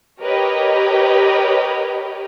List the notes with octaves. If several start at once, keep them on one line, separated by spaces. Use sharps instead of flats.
G4 A#4 B4 C#5 D#5 G5